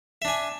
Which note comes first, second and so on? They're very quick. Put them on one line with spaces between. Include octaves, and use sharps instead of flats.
E5 D4 G#5